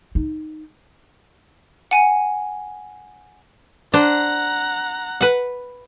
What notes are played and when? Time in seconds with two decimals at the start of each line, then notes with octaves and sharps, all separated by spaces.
0.15 D#4
1.91 F#5 G#5 D#7
3.93 D4 C5 F#5 A#5
5.21 B4 F#5